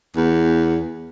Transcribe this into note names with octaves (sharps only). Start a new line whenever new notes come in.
E2